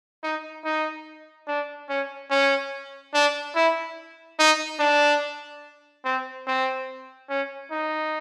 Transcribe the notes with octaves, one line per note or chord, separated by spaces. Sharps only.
D#4
D#4
D4
C#4
C#4
D4
E4
D#4
D4
C4
C4
C#4
D#4